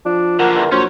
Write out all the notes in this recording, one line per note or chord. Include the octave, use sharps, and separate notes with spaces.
F3 D4
D3 A#3 F#4 A#4
E2
A#1 F#3 C#4 C5 C#5